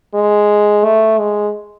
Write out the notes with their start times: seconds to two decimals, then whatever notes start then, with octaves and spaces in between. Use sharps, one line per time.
0.14 G#3
0.85 A3
1.19 G#3